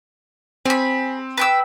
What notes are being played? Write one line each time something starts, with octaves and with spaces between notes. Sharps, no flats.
C4 G#4 B5
B4 G5 E6